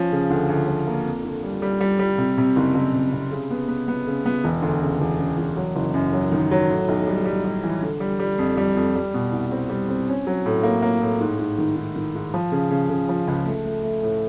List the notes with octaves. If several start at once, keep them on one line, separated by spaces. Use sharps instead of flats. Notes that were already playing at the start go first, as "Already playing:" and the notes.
Already playing: F3 C#4
C#3
D2
D2
F3
A#3
F2
D3
G3
G3
G3
G3
C3
C3
F#1
F#1
C3
C3
C#3
B3
B3
B3
C#3
B3
E1
D2
C#3
E1
C#3
E1
F#3
F#1
F#2
F#3
D#3
F#3
A2
B1
G3
G3
G3
E3
D3
G3
G3
F2
G3
F2
G3
B2
C2
C4
G3
C4
C#4
F#3
A2
A#3
A#3
A2
G#2
G#2
D#3
G#2
D#3
G#2
F3
C#3
C#3
C#3
F3
C#2
A3
A3
A3
A2